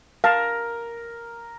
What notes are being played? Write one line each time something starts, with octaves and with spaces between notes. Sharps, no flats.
A#4 F5 A5